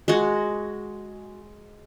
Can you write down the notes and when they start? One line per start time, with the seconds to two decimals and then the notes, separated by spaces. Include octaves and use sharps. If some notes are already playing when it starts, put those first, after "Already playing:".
0.08 G#3 F#4